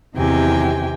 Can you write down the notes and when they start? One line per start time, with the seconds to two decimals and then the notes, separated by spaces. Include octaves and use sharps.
0.15 E2 C3 D#3 G4 G5 G#5